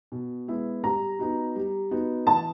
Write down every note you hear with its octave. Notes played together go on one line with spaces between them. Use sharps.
B2
G#3 B3 E4
G3 A#5
B3 D#4 F#4
G3
B3 D#4 F#4
E3 A5